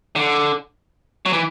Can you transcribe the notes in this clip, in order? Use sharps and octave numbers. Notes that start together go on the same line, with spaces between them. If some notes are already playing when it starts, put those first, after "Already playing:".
D3
F#3
E3